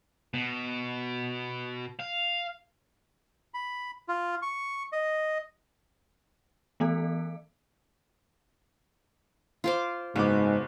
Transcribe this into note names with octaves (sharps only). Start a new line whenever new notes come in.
B2
F5
B5
F4
C#6
D#5
E3 A3 B3 A4
F4 C5 D6
F#1 G#2 B3 F#4 D6